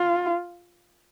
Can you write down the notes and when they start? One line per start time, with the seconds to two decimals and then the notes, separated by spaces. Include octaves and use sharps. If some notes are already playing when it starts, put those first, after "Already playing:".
Already playing: F4